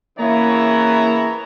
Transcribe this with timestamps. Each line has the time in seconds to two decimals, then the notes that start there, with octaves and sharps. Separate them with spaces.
0.19 C#3 E3 A#3 B3 E4 C#5 A#5